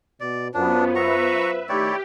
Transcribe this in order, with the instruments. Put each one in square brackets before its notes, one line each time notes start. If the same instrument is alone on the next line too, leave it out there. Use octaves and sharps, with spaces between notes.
[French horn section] B2 [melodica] D5
[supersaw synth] F#2 B3 [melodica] D4 [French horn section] F4 C5
[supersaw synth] B4 E5 [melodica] A#5 C#6
[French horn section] D#3 A3 [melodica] E4 C#5 D5 [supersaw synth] G4